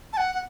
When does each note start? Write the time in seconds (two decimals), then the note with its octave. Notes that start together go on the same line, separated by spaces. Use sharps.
0.13 A5
0.17 F#5
0.33 F#5